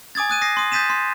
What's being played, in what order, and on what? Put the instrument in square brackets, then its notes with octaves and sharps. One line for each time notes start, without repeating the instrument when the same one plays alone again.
[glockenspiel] G#5 D6 D#6 G#6 A6
D#6 F#6 D#7
D#6 A#6 C7
C6 D#6
D#6 G6 A6 B6 D#7 E7
C6